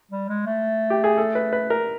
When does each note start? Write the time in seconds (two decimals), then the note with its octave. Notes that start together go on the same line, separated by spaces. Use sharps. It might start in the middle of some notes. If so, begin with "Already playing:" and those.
0.11 G3
0.29 G#3
0.46 A3
0.90 G4
1.04 G#4
1.18 A4
1.35 B4
1.53 B4
1.70 A#4